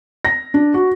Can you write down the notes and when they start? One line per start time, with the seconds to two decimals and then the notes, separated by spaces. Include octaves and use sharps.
0.25 A#6
0.54 D4
0.74 F#4